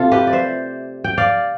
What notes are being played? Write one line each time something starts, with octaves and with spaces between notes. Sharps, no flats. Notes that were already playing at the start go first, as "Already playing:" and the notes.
Already playing: C3 A3 F4 A4
G4 B4
D5
C5 E5
G5
D5 F5